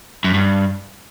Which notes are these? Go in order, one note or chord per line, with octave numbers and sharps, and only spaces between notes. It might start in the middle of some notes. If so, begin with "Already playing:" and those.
F#2
G2